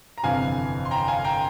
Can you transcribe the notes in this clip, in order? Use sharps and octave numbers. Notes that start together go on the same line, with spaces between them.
A#5
G1 F2 C3 E3 F5 G#5
C6
G5 A#5
F5 G#5
G5 A#5